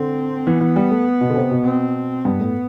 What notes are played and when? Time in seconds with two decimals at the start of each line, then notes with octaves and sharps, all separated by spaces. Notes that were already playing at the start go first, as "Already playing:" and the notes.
Already playing: D3 C4
0.47 E3 B3
0.61 E3
0.76 G3
0.91 A3
1.21 B2
1.30 D3
1.36 C3
1.51 B2
1.66 C4
2.25 G2 B3
2.40 A2